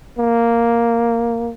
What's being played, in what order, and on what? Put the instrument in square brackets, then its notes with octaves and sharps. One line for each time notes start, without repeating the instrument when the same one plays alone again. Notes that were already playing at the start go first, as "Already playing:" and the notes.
[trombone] A#3